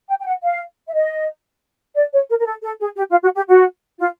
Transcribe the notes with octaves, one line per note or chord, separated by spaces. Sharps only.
G5
G5
F#5
F5
E5
D#5
D5
C#5
A#4
A#4
A4
A4
G#4
G4
F4
F#4
G4
F#4
F4